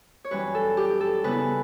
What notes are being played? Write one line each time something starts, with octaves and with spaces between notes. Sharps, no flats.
C#5
F#2 E3 G3 C#4 B4
A4
G4
A4
C#3 G3 B3 E4 B4